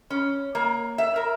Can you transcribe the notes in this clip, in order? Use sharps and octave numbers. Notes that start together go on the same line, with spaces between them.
C#4
A#3
E5
A#4